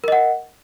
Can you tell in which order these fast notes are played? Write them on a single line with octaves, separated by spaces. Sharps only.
A#4 D#5 F#5